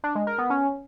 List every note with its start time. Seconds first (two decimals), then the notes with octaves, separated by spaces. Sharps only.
0.04 D4
0.15 G#3
0.27 A#4
0.38 B3
0.50 C#4